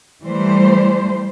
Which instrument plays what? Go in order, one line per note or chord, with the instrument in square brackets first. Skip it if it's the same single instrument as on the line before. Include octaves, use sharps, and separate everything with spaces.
[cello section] E3 G3 A3 C5